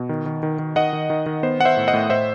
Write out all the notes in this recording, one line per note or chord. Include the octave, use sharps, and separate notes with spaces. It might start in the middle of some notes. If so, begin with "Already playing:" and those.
Already playing: B2
D#3
D#3
D#3
D#3
D#3 D#5 F#5
D#3
D#3
D#3
B3 C5
B3 F#5
C5 E5
A2
D#5 F#5
A2
A2 C5 E5